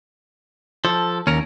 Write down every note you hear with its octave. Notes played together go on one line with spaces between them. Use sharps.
F3 A4
D#2 C#4 A#4